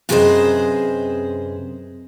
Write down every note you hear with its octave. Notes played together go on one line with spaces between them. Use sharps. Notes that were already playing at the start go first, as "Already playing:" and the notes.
F#2 C3 G#4 B4 C5 D#5